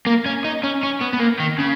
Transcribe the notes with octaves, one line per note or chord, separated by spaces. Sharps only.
A#3
C#4
D#4
C#4
C#4
B3
B3
A#3
D#3
C#3